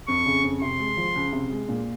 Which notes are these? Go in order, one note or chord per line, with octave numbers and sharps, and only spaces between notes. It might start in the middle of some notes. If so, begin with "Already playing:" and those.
F2 C#6
C#3
F2
C3 C6
G#3
F3
C#2
C3
G#3
A#2